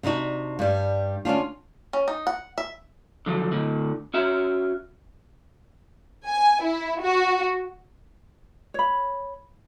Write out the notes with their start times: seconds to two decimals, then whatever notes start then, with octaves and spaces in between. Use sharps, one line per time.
0.03 C3 D4 D#4 F#4
0.59 G2 G3
1.25 D2 C#4 D4 F4
1.93 C#4
2.08 D#4
2.27 F#5
2.58 E5
3.26 D3 F3 F#3
3.51 A2 D3
4.14 C#4 F#4 E5
6.27 G#5
6.64 E4
7.02 F#4
8.74 C#5 B5